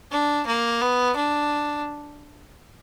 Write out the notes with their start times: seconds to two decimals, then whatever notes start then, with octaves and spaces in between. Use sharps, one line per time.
0.11 D4
0.47 A#3
0.81 B3
1.16 D4